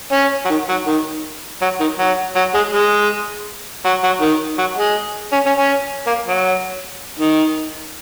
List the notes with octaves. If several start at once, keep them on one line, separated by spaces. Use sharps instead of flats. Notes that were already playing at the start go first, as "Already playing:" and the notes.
C#4
F#3
D#3
F#3
D#3
F#3
D#3
F#3
F#3
G#3
G#3
F#3
F#3
D#3
F#3
G#3
C#4
C#4
C#4
A#3
F#3
D#3